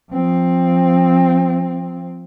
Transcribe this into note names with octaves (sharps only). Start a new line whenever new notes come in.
F3 C4